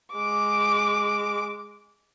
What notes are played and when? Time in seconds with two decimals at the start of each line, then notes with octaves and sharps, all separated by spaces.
0.14 G#3 D6